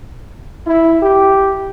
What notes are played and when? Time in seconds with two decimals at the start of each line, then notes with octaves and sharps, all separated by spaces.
0.67 E4
1.02 G4